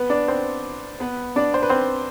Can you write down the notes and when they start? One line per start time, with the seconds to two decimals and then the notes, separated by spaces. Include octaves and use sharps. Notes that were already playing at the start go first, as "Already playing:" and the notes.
Already playing: B3 B4
0.10 D4 D5
0.28 C4 C5
1.00 B3 B4
1.36 D4 D5
1.54 C5
1.63 B4
1.69 C4 C5